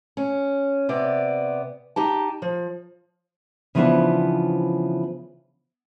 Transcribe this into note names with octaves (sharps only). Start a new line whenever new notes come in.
C#4
C3 B3 D5
D#4 G4 A5
F3
C#3 E3 F3 B3 D4 C5